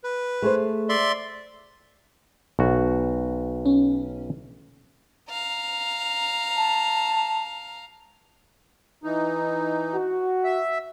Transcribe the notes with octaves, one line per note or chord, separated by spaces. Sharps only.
B4
A3 G#4 C5
D5 E5 C6
B1 F#4
C#4
F5 A#5
A5
E3 D#4
F#4
E5